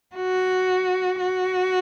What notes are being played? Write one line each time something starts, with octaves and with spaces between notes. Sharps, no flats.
F#4
F#4